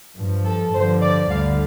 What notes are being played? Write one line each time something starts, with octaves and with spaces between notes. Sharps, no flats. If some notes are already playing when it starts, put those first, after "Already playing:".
G2 F3
A4
G2 D3 F3 C5
D5
D2 D3 G3 F5